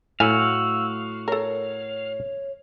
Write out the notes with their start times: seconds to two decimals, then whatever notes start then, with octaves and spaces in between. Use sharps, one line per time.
0.20 A2 F#3 E4 F#4 F5 G#5 E6
1.28 A4 A#4 C#5